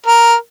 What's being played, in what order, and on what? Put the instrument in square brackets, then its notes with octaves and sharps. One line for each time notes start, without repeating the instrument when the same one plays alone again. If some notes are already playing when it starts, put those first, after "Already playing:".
[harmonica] A#4